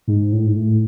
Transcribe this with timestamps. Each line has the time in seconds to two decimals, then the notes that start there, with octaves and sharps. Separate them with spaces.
0.08 G#2
0.33 A2
0.46 G#2
0.56 A2